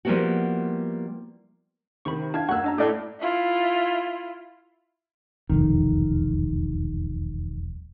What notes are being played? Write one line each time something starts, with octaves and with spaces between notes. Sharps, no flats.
F3 G3 A#3 B3 E4 F#4
C3 D#3 B5 C#6
D4 E4 F5 G5 A5 G#6
F#2 A#3 F#5 C#6 E6 F#6
D4 D#5 A#5
A2 D5 E5 A5 D6 G6
E4 F4
E1 C2 F2 D#3